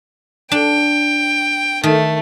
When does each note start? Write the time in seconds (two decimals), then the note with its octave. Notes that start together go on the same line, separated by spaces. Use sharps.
0.52 D4 G5
1.83 D#3 A3